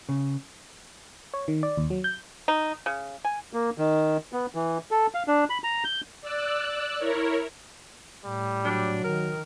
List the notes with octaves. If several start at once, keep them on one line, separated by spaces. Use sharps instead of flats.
C#3
C#5
D#3
D5
D#2
F#3
G6
D#4
C#3
G#5
A#3
D#3
B3
E3
A4
F5
D4
B5
A#5
G6
D5 E6 F#6
E4 A#4 C#5
A2 G3
F#3 D4
D#3 A#4